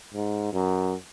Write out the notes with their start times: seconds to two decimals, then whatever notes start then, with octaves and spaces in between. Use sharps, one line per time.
0.14 G#2
0.53 F#2